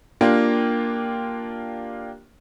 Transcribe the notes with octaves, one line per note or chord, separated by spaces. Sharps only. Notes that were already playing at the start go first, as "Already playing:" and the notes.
A#3 D4 F4 G4